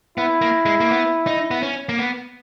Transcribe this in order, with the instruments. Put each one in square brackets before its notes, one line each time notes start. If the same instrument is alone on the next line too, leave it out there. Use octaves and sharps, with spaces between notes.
[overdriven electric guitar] B3 [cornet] E4
[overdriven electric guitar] A#3
G#3
A#3
B3
D#4
B3
C#4
A#3
B3